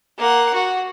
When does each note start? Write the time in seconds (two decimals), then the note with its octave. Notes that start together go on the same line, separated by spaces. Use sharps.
0.18 A#3 F#5
0.54 F#4